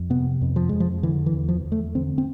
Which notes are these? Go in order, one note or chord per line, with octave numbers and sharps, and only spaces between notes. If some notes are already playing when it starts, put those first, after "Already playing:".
Already playing: F2
C3 B3
F2
F3
F2 G#3
F3
D3 E3
E3
E2
F3
E2
A3
D3 C4
C4